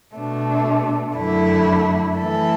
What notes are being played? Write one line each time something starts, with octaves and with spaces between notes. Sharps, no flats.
B2 A3 D4
F#2 D3 A3 E4
E3 A3 E4 A4